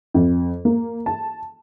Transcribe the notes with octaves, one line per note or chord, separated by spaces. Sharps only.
F2
A#3
A5